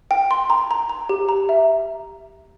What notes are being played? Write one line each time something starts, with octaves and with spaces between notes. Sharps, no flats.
G5
C6
A#5
A#5
A#5
G4
A#5
E5